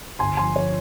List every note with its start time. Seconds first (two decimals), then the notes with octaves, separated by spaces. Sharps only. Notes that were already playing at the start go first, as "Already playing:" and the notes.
0.19 G1 G#5 C6
0.37 F3 G#5 C6
0.56 F3 C#5